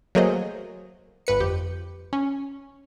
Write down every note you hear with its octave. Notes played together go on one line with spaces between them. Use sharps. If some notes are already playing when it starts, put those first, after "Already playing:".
F#3 A3 A#3 G#4 C5 D#5
G1 B4 C#7
F2 G4
C#4